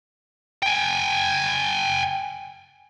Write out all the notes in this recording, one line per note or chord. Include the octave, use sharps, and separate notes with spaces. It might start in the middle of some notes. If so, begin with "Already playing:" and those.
G5 G#5